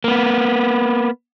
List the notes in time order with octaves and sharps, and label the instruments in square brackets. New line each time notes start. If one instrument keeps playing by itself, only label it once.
[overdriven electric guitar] A#3 B3